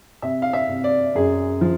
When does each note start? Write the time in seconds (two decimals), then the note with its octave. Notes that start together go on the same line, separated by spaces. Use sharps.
0.22 C3 E5
0.42 F5
0.53 E5
0.69 C3
0.84 D5
1.15 F#2 G#4
1.61 F3